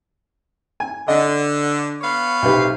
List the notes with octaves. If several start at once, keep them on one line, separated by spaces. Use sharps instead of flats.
G#5
D3 D#5
B3 C#5 F5
B1 C3 B4